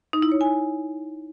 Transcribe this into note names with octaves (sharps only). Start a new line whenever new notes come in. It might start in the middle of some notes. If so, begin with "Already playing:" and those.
D#4
E4
C#5
G#5